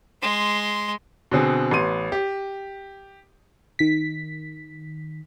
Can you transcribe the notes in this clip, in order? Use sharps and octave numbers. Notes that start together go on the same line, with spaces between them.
G#3 C6
B2 D3 C4 G#4
A1 B3 C6 D#7
G4
D#3 B6